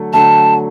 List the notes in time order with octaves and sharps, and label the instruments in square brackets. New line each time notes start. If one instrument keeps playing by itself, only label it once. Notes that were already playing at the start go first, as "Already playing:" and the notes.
Already playing: [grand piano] D3 F#3 A3
[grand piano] D3 F#3 A3 [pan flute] A5